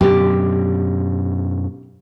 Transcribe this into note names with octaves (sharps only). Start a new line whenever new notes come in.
F#2 B2 D3 G4